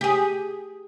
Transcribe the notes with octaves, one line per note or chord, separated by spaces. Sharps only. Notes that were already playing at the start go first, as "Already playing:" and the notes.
G4 G#4